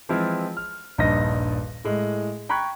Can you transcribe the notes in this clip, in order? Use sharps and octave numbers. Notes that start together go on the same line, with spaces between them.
E3 F3 G#3 C4 E4 F4
F6
D#1 A#1 G2 D#4 D#5 A#6
A2 G#3
G5 A#5 B5 C#6 F#6 G#6